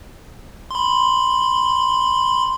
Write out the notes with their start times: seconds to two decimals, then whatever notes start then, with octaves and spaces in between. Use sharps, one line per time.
0.71 B5 C6